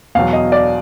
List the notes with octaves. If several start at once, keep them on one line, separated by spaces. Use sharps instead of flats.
E2 B2 F#3 F5
D#5
D5